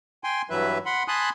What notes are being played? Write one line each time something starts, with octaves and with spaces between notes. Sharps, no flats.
G5 G#5 C6
G2 E3 F#3 B4 E5
F#5 B5 C6
G#5 A5 B5 C6 D#6 F#6